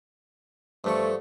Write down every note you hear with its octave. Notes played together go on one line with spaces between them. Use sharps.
G2 F3 A3 A4 C#6